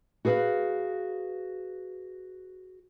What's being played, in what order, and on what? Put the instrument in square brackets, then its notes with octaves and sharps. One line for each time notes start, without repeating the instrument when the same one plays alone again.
[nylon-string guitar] F#4 G#4 B4 F5